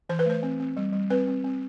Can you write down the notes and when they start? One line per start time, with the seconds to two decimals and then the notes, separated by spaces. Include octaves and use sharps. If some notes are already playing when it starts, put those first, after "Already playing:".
0.09 E3 C5
0.19 B4
0.26 A3 C5
0.43 C4
0.60 C4
0.77 G3
0.93 G3
1.10 C4 B4
1.27 C4
1.44 C4